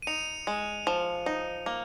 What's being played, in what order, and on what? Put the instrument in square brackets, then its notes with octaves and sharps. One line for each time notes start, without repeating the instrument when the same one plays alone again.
[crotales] D#7
[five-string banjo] D#4 [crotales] C#7 F7
[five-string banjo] G#3
F3
D#4
A#3